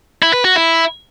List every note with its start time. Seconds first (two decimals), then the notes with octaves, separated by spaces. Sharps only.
0.22 E4
0.34 B4
0.45 F#4
0.56 E4